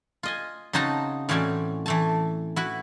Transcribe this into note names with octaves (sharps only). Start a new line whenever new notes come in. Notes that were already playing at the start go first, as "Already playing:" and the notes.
F4 D#5 G#5
C#3 C4 D#4 F#4 A5 A#5
A2 E3 C4 C#4 F#4 D5
E3 A3 A5
E4 F#4 B4